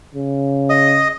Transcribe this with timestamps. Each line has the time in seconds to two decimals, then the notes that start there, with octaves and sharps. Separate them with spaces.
0.15 C#3
0.70 D#5 D#6